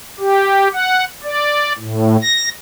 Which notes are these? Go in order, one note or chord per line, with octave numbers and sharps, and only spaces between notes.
G4
F#5
D5
A2
A#6